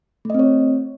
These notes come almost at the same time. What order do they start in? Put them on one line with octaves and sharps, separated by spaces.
A3 D#5 C4 C#5